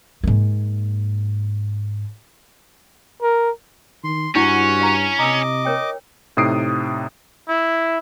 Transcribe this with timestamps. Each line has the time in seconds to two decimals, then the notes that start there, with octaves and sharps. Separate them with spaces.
0.24 G#2 A#3
3.22 A#4
4.04 D#3 C6
4.35 G2 C#4 D4 E4 F#4 F#5
4.81 F5 A#5
5.19 C3 D#5 A#5 D6 E6
5.65 A#4 C#5 G5
6.37 A2 C3 D#4 D#6 C7 D7
7.48 E4